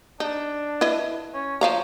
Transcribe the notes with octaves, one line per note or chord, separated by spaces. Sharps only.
D4 D#4
E4 B4 D#5
C#4
F3 C#5 F5 A#5